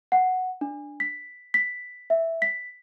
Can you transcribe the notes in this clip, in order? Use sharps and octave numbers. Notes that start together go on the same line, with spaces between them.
F#5
D4
B6
B6
E5
B6